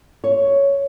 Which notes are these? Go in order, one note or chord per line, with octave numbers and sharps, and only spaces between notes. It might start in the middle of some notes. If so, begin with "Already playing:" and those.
C#5